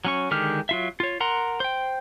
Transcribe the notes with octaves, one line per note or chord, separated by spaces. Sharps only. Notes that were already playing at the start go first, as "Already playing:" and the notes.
F#3 C#4 C#6
D3 D#3 G#3 G4 F6
F#3 F4 E5
F4 C#5
A#4 F#5 A#5 C6
C5 G5